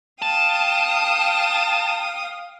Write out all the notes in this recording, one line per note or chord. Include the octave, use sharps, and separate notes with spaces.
F5 G5 A5 D#6